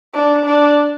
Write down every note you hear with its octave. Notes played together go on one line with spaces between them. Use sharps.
D4
D4